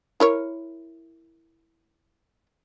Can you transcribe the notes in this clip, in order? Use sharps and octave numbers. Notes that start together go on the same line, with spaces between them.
E4 A#4 C#5